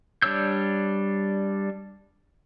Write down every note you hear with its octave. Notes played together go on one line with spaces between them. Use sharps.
G3 D4 C#5 E6 G6